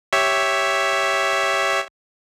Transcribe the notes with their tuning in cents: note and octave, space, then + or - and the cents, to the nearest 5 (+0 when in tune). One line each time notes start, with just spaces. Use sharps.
G4 +0 C#5 +0 E5 +0